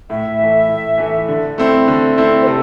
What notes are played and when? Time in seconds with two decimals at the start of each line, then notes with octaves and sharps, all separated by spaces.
0.10 A2 E5
0.39 E3 A3
0.69 A2
0.98 E3 A3
1.28 D3
1.58 A3 C4 E4
1.88 D3
2.17 A3 C4 E4
2.42 C5
2.47 C3 A4